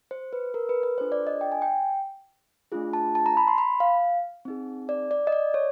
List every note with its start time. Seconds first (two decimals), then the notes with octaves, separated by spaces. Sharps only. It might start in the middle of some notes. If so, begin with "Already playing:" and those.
0.11 C5
0.33 B4
0.54 A#4
0.69 B4
0.83 B4
0.98 D4 F4 A4 C5
1.12 D5
1.27 D#5
1.41 G5
1.52 G#5
1.62 G5
2.72 A3 D4 F4 G#4
2.93 A5
3.15 A5
3.26 A#5
3.37 B5
3.48 C6
3.58 B5
3.80 F5
4.45 C4 D#4 G#4
4.89 D5
5.11 D5
5.27 D#5
5.32 D5
5.54 C#5